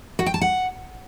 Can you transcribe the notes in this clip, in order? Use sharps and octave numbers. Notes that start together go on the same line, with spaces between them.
F#4
G5
A5
F#5